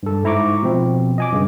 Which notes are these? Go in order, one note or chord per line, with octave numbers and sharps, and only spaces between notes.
G2 A4
G#2 E4 A#5 C#6 D6
B2 F3 C4
D#5 G#5 D6
G2 C#3